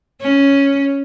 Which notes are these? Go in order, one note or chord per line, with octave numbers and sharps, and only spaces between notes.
C#4